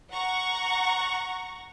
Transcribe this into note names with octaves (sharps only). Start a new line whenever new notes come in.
F#5 A#5 C#6